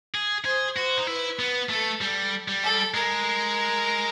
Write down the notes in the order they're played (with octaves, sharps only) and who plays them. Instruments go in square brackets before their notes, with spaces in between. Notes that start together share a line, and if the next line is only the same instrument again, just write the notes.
[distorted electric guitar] G#4
[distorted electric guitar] G#4 [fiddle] C5
[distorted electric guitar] F#4 [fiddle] C5
[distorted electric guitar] D#4
[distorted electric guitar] E4 [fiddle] B4
[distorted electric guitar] B3 [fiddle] B4
[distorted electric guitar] A3 [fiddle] A4
[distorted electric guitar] G3 [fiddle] A4
[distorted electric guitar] G3
[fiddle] A4
[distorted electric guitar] G#3 [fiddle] A#4